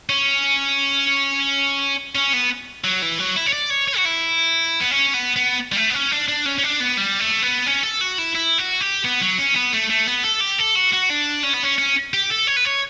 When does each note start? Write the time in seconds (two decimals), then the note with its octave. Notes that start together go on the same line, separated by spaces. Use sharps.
0.09 C#4
2.15 C#4
2.33 B3
2.84 F#3
3.02 E3
3.19 F#3
3.36 E4
3.46 C#5
3.53 D5
3.70 C#5
3.88 C#5
3.97 F#4
4.06 E4
4.81 B3
4.91 C#4
5.14 B3
5.36 B3
5.73 G3
5.76 A3
5.90 B3
5.94 C#4
6.11 D4
6.28 D4
6.46 C#4
6.58 C#4
6.63 D4
6.80 B3
6.97 G3
7.20 A3
7.43 B3
7.67 C#4
7.83 A4
8.01 F#4
8.18 E4
8.35 E4
8.58 F#4
8.80 G4
9.04 B3
9.21 F#3
9.38 C#4
9.55 B3
9.73 A3
9.90 A3
10.07 B3
10.24 A4
10.41 G4
10.59 A4
10.76 F#4
10.93 F#4
11.10 D4
11.44 C#4
11.54 B3
11.64 C#4
11.79 C#4
12.14 G4
12.30 A4
12.47 C#5
12.57 B4
12.65 C#5